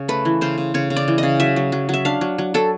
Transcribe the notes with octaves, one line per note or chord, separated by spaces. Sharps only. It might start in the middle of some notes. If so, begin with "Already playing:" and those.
Already playing: C#3
A3 B4
E3
C#3 C5
C#3
C#3 C#5
C#3
D5
E3
C#3 D#5
F#3 E5
F#3
F#3
F#3 E5
D4 F5
F#3
F#3
F#3 A4